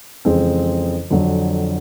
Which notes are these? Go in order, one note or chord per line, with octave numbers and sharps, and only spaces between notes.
F2 C#3 E3 G#3 C4
F2 D3 F#3